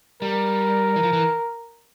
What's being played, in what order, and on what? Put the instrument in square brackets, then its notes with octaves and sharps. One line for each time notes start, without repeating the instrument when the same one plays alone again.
[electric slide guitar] G3 [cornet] A#4
[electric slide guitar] E3
F3
E3